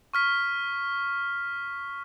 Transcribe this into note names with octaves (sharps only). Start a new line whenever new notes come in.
C#6 F6 B6